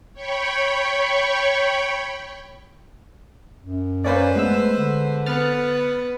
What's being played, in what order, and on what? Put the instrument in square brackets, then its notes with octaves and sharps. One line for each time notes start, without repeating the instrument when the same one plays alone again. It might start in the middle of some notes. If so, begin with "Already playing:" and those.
[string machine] C#5 G5 B5 C#6
[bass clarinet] F#2
[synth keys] A#3 C#4 D5 [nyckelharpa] B4 C5
[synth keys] G#3 B3 E6 [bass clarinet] A3
[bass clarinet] D3
[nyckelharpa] B3 [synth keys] F6 A6